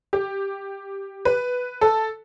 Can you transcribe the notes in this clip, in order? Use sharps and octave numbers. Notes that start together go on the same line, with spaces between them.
G4
B4
A4